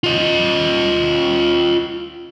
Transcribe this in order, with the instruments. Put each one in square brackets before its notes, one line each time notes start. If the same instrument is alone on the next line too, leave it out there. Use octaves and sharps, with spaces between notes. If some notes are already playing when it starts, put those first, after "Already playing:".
[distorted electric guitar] F4 D#5